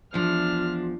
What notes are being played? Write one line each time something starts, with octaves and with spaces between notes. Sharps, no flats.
E2 F3 D4 F4 F6